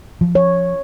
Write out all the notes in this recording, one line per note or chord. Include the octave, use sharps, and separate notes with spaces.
F3
C#5